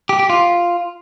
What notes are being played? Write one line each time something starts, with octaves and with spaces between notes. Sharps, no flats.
G4
G4
F4